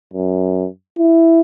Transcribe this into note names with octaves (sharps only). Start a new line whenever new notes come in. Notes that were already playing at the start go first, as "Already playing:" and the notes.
F#2
E4